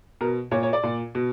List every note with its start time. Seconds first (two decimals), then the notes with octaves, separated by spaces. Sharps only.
0.21 B2 A#4
0.51 A#2 C#5
0.63 C#5
0.73 D5
0.83 A#2
1.15 B2